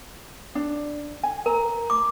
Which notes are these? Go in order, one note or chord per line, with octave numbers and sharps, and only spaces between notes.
D4
G#5
A#4 A#5
D6